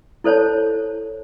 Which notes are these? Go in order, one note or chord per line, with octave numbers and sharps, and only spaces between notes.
E4 A4 C5 C#5 A5